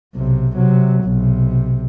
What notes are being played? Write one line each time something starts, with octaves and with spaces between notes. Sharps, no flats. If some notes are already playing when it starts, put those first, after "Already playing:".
B1 C3
C3 F#3
B1 C3